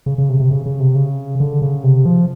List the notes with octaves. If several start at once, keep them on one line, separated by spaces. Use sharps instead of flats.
C#3
C#3
C3
C3
C#3
C#3
C3
C#3
D3
C#3
C3
F3